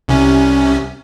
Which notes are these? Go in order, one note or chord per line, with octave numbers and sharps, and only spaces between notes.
C2 C3 C#4